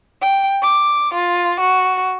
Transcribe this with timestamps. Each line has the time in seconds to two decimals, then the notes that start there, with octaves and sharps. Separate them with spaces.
0.21 G5
0.62 D6
1.14 F4
1.60 F#4